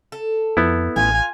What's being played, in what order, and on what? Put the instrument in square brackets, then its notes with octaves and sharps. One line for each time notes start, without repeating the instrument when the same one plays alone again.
[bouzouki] A4
[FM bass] F2 [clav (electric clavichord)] B3 E4
[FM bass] A1 [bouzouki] F4 [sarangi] G#5